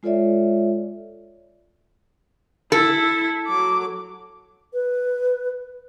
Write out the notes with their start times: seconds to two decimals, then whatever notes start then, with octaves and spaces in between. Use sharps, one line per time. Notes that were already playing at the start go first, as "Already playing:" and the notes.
0.03 G#3 F4 A4 C#5 D5 E5
2.72 E4 A4
3.47 F#3 D6
4.73 B4